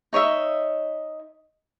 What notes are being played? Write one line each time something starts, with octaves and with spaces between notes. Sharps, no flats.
D#4 C#5 D#5 E5